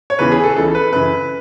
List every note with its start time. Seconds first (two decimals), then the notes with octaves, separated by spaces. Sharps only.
0.10 C#5
0.19 E2 C#3 E3 B4
0.32 G#4
0.44 A4
0.56 C#2 C#3 E3 A4
0.75 B4
0.92 F#2 C#3 E3 B4